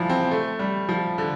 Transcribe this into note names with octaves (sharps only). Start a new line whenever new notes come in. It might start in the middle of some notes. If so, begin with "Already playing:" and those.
Already playing: E3 F3 G3
C4
A3
G3
F3
D3